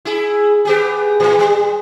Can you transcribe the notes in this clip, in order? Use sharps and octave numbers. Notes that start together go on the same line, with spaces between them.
E4 G#4
B3 G4 G#4
A2 E3
G3